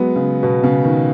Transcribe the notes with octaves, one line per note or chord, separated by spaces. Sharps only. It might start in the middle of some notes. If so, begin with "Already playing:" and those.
Already playing: F#3 G#3 B3
C#3
B2
C#3
D#3